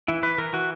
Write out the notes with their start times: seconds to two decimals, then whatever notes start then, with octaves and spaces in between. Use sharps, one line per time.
0.08 E3 E4
0.23 E3 B4
0.38 E3 A#4
0.53 E3 F#4